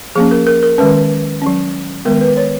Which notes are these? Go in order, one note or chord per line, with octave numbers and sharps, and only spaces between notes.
F3 A#3 C#4 G#4
A#4
A#4
A#4
D#3 G#3 C#4 B4
F#3 C#4
D#3 G#3 B3 A#4
B4
C#5